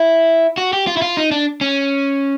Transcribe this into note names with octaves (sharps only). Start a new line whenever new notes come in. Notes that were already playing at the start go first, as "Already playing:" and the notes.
Already playing: E4
F#4
G4
F4
E4
F4
D#4
D4
C#4